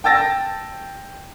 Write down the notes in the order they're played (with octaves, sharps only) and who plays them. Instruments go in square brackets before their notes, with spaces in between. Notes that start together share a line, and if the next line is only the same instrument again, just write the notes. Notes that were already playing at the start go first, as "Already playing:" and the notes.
[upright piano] G5 A5 E6 A6 A#6